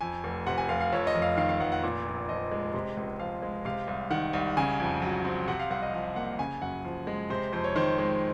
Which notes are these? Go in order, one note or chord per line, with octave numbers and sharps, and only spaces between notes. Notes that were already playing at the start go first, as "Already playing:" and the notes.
F2 G#5
F1
C3 F#5
G#5
F1 F5
F5
F2 C#5
D#5
F1
F5
D#3 F5
F5
F1 F#5
F#5
A#2
A#1
F3 D#5
G#3
C3
C#2
F3 F5
G#3
C3 F5
C2
D#3 F#5
C2
C#3 G#5
F2
F#3
C4
C3 F#5
F5
C2 F#5
D#5
F3
A#3 F#5
C#3 G#5
F#2 F#5
F3
G#3
C3 C5
F2 C5
C#5
D#3 C5
G#3